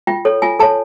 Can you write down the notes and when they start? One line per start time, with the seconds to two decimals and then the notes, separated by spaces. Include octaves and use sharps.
0.07 F4 G5
0.25 A4 C#5
0.42 F4 G#5
0.59 A4 C#5 A5